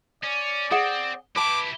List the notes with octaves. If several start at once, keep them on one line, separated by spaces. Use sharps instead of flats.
C#4 D5
C4 G#4 F#5
E4 G4 B4 A5 D6